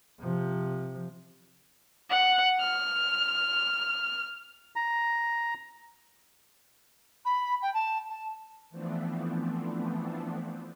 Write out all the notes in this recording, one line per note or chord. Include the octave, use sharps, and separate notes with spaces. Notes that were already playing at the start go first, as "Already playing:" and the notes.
C3 F3
F#5
F6
A#5
B5
G5
A5
A5
E3 F3 A3 B3 C4 D4